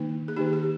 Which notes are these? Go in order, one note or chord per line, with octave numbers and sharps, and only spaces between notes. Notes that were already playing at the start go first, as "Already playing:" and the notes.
Already playing: D#3 A#3 D#4
G#4
D#3 A#3 D#4 G4
G4